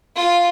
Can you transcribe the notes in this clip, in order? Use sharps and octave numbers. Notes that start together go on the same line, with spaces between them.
F4